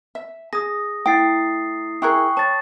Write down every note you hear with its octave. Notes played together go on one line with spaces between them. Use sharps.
E5
G#4 D#6 A#6
A3 E4 G5 D#6 A6 C7
E4 G#4 A#4 G5 C#6 F#6
C#5 A5 A6